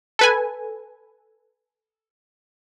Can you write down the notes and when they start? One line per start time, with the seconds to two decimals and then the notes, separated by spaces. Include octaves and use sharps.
0.19 A4 B4 G#5